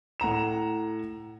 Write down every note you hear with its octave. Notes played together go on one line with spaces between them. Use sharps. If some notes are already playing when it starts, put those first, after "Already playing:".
A2 F#5 A#5 E7